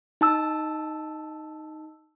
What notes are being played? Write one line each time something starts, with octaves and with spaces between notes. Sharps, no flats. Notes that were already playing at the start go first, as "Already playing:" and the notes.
D#4 A5 E6